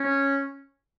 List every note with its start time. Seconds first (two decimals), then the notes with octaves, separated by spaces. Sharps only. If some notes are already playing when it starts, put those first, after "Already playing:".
Already playing: C#4